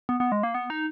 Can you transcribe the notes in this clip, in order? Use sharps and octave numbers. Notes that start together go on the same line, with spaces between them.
B3
B3
G#3
A#3
B3
D#4